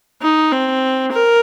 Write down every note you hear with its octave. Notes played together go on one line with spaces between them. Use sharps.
D#4
C4
A#4